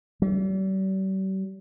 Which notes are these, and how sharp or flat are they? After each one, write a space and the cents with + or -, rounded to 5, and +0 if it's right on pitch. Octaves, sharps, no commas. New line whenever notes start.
G3 -40